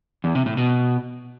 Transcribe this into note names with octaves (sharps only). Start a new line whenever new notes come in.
E2
C3
A2
B2